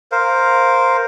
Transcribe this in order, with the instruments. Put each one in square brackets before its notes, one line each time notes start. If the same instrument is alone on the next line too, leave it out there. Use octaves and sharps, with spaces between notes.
[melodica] A#4 C5 F5